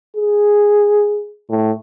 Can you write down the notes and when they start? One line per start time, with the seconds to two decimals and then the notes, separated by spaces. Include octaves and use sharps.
0.17 G#4
1.50 A2